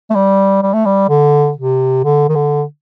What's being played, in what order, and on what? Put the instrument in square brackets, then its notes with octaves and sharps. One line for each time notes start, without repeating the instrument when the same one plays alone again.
[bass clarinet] A3
G3
G3
A3
G3
D3
C3
D3
D#3
D3